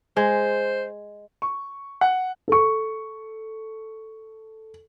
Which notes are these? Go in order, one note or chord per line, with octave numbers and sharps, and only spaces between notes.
G#3 C5
C#6
F#5
A4 C#6